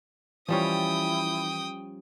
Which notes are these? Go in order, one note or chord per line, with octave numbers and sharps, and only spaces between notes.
E3 F3 G3 C#4 E4 G5 D#6